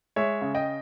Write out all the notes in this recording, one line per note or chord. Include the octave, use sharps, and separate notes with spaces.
G#3 C#5 E5
C#3
D#5 G5